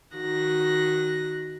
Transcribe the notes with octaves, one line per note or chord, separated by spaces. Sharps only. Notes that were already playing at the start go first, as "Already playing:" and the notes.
D#3 F#4 F#6 A#6